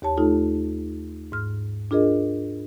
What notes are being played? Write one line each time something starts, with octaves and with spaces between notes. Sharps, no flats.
D#2 G4 C#5 A5
A3 D#4 F4 G4 A4
G#2 F6
D4 F4 G#4 A#4 D#5